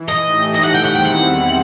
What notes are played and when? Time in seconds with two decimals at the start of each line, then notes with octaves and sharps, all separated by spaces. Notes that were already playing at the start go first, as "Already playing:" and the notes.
Already playing: E3
0.08 D#5
0.23 A2 E3 A3 D#4 G4
0.55 D#5
0.64 F#5
0.75 G5
0.85 E2 D#3 G3 C4 E4 F#5
0.96 G5
1.06 F#5